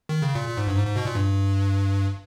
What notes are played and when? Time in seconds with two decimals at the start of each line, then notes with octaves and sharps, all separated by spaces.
0.09 D#3
0.22 C#3
0.35 A#2
0.48 A#2
0.57 G#2
0.67 G2
0.76 G#2
0.87 G#2
0.96 B2
1.05 A#2
1.15 G2